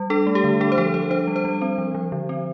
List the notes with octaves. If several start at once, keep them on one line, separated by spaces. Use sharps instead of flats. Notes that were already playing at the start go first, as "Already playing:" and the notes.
Already playing: G3
D4 A4
A3
G4
D3
D4 A4
C5
F3 A4
F3 C5
D4 C5
G3
C5
G3
C4
F3
F3
D3
C4